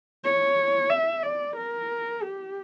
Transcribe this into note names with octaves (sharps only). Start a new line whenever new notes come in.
C#5
E5
D5
A#4
G4